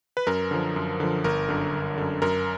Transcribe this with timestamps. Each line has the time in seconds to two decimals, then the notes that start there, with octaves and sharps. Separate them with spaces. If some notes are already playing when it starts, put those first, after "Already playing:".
0.17 B4
0.27 F#2 A#4
0.51 D3 F3
0.76 F#2
1.00 D3 F3
1.24 G1 A#4
1.49 F#2 D3
1.73 G1
1.98 F#2 D3
2.22 F#2 A#4